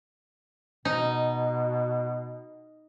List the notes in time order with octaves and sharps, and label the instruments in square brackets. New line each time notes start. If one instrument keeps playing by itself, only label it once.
[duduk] B2 [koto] D#4